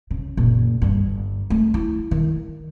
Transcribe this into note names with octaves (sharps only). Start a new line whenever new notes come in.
C#3
F#1 A#2
G1 G2
A3
E4
D#3